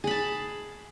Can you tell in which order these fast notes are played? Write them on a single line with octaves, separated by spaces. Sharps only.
G#4 B5 A5